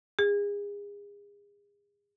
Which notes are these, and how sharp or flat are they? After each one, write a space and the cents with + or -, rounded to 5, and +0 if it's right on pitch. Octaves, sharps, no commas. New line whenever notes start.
G#4 -35